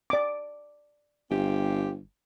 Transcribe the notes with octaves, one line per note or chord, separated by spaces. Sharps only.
D5 D6
G1 C4 F4 G4